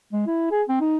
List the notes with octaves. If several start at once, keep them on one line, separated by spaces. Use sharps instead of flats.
G#3
E4
G#4
C4
D#4